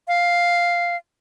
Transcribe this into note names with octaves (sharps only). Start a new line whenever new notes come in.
F5